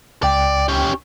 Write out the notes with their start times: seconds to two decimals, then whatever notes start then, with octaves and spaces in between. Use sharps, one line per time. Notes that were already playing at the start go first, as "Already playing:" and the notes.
0.23 C#2 D5 G5
0.69 C#4 G4